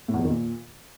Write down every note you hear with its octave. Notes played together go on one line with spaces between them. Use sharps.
A2
E2
F2
D#3
A#2